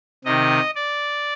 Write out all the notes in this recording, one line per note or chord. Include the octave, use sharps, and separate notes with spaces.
C3 D#3 D#5
D5